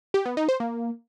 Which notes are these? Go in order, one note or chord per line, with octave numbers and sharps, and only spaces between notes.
G4
B3
D#4
C5
A#3